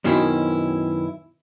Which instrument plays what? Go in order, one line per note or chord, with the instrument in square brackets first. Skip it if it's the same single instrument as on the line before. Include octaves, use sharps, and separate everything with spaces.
[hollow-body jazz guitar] F#2 B2 D#3 C4 C#4 E4